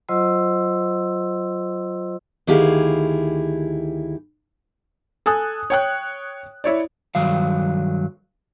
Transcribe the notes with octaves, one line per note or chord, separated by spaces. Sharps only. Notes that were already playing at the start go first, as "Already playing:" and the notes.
F#3 F4 C5 D#5 C6 E6
D2 D#3 E4 G4 G#4 F5
A4 G#5 D#6 F#6
C#5 G5 F#6
E4 C#5 D5
G2 D#3 F#3 F5